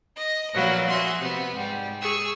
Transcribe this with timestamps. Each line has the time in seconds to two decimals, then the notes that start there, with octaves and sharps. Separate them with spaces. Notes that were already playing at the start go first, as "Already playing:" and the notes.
0.15 D#5
0.52 A#2 F3 F#3 A#3 B3 E4
0.88 F#4 G#4 E5 C6
1.18 C3 B3
1.54 G#2 G3
2.00 G#4 C#6 E6